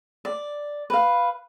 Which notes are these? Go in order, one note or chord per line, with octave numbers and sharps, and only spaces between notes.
D5
B4 F5